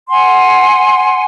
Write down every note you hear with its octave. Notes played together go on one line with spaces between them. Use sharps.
F#5 G#5 C6